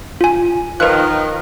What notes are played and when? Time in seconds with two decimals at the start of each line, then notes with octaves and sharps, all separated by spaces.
0.21 F4 G#5
0.80 D#3 F3 B4 F#6